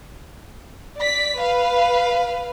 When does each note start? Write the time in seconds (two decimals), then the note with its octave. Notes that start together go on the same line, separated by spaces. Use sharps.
0.97 D5 B6
1.40 B4 F5